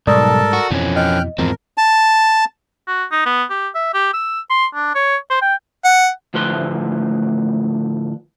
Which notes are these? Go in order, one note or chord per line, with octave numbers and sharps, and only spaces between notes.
B1 G#2 G3 A4 A#4 D5 A5 D#6
F#4
F2 B2 E3 F3 C#4
D#5 G5 F6 F#6
E2 G#2 F3 C4 A#4
A5
F#4
D#4
B3
G4
E5
G4
E6
C6
D4
C#5
C5
G5
F#5
D2 A2 F3 B4 C6